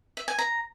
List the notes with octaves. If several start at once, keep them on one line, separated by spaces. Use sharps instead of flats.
E5
G#5
A#5